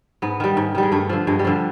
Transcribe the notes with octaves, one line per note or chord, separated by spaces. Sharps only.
G#2 B3
D#3 G3
G#2
D#3 G3
G#3
G2 A3
D3 F3
G2 G#3
G3
D3 F3